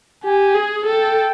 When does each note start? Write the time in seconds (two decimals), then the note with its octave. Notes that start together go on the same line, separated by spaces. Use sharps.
0.24 G4 G#5
0.55 G#4
0.86 A4 G5